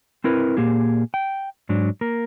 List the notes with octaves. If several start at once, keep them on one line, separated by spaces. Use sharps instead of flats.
C4 E4 A#4 B4
A#2 A#3 G4 G#4
G5
G#2 F#3 D4
A#3 A#4